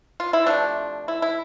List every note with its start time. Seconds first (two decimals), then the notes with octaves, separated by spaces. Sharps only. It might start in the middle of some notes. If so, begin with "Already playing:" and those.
0.20 F4
0.33 E4
0.46 C3 F3 A3 D4
1.08 E4
1.22 E4